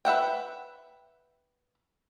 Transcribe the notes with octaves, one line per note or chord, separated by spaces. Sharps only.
B4 E5 F#5 G5